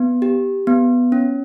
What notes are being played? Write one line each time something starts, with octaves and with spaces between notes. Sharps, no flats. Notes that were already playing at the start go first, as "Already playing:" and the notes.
Already playing: B3
G4
B3
C#4